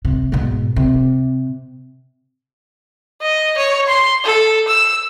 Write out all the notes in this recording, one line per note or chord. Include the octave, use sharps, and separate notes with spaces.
C3
G#2 B2
C3
D#5
C#5
C6
A4
E6